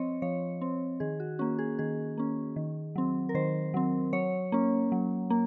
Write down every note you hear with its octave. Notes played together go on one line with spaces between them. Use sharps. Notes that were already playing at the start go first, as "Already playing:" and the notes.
Already playing: F3 C4 C#5 D#5
F3 C#5
C4
D#3 G#4
F#4
A#3 C#4 F#4
G#4
D#3 G#4
A#3 C#4
D#3
F#3 C4
A#4
D#3 C5
F#3 C4
F#3 C#5
A#3 C#4
F#3
A#3